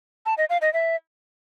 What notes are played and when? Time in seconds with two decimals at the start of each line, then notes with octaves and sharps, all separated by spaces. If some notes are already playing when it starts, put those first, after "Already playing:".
0.26 A5
0.38 D#5
0.50 F5
0.62 D#5
0.73 E5